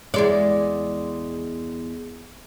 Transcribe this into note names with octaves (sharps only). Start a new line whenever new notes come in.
E2 G#3 D5